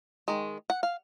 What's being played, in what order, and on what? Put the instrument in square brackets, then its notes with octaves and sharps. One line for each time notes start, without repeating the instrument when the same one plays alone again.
[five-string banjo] D#3 G#3
F#5
F5